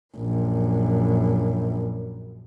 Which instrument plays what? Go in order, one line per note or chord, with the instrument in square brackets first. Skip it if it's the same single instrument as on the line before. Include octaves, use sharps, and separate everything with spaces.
[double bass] A#1 F#2